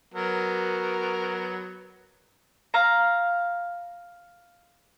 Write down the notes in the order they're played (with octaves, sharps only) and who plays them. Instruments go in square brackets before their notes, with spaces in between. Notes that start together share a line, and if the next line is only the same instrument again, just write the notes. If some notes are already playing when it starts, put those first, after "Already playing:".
[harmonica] F#3 B3 A#4
[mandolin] F5 A#5